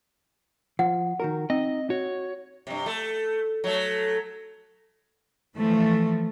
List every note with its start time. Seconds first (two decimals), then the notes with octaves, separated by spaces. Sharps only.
0.79 F3 F#5
1.20 D#3 F#4 A#4
1.50 C4 D#4 D#5
1.90 F#4 C#5
2.67 G2 C3
2.86 A3
3.64 F#3 A3
5.56 E3 F3 A3